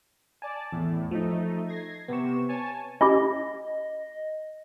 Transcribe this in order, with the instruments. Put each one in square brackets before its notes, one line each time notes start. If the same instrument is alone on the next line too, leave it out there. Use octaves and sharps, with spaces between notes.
[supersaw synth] D5 A5 [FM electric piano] G#5
[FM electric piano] E2 [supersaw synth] A2
[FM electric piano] F3 [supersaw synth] A3 D#4
[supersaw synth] G#6 A#6 C7
[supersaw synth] C3 E7 [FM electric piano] B3 C#6
[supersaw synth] C#5 G#5 A5
[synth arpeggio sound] C#4 E4 G4 [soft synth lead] D#5